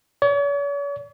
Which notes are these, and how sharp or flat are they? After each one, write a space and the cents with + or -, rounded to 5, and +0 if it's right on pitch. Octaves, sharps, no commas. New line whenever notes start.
C#5 +45